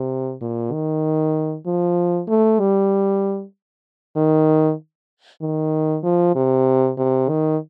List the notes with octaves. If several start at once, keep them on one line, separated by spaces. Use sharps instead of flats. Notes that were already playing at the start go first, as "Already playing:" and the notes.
Already playing: C3
A#2
D#3
F3
A3
G3
D#3
D#3
F3
C3
C3
D#3